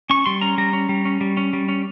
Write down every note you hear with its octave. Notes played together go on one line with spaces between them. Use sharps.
C#4 C#6
G3 C6
C#4 A#5
G3 A#5
C#4
G3
C#4
G3
C#4
G3
C#4